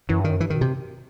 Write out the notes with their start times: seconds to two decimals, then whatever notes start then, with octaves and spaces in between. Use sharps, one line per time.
0.09 F#2 E3
0.20 G2
0.24 D#3
0.30 F#2
0.40 G2 E3
0.50 D#3
0.55 B2
0.61 C3